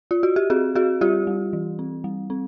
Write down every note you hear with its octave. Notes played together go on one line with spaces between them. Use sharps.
F4
F#4
G4
C4 F#4 G#4
C4 F#4 G#4
G3 F4 G4
G3
E3
C4
G3
C4